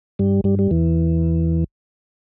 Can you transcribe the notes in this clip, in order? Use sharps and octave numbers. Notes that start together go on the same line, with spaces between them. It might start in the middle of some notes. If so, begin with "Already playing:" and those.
G2 G3
G2 G3
G3
E2 E3